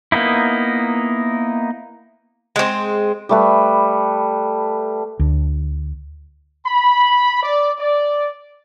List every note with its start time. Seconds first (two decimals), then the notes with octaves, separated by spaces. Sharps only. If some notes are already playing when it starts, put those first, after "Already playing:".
0.12 A#3 B3 D#4 E4
2.56 G#3 C4
3.29 G3 A3 B4
5.19 D2
6.66 B5
7.43 D5
7.79 D5